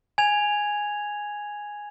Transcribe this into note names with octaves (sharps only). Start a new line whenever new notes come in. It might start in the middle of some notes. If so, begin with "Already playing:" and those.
G#5 G#6 F7